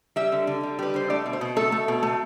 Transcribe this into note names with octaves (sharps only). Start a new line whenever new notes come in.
G3 E5
D3
D3
G3
G3 B4
D3 C5
A3 D5
B2
C5
B2
A3 A4
A3
B2
A3